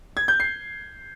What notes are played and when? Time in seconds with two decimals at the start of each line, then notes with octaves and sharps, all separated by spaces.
0.17 G#6
0.28 G6
0.40 C7